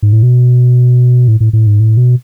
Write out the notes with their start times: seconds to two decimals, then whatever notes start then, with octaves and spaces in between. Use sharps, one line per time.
0.02 G#2
0.13 A2
0.23 B2
1.28 A2
1.40 A2
1.53 A2
1.67 G#2
1.80 A2
1.97 B2